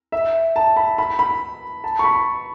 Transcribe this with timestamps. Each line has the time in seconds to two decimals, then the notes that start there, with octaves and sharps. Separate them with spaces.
0.12 E5
0.56 A5
0.77 B5
0.98 B5
1.19 B5
1.84 A5
1.99 C#6
2.04 B5